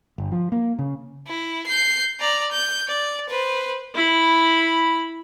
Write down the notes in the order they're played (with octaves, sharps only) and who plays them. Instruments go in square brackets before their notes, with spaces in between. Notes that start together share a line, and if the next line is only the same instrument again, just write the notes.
[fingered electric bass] G1
F3
A#3
C#3
[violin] E4
G6 C7
D5 A#5
G6
D5
B4 C5
[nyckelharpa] E4 B5